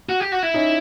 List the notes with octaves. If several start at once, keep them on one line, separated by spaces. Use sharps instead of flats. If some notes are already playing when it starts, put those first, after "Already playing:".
F#4
G4
F#4
E4
C#4 D#4